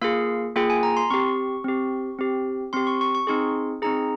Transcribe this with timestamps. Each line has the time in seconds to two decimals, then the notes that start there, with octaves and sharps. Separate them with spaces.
0.01 A#3 F4 G#4 F5
0.56 A#3 F4 G#4 G5
0.70 G#5
0.83 A#5
0.97 C6
1.10 C4 G4 C#6
1.64 C4 G4
2.19 C4 G4
2.73 C4 G4 C6
2.87 C#6
3.01 C#6
3.15 C#6
3.27 C4 D#4 G#4 C6
3.82 C4 D#4 G#4 A#5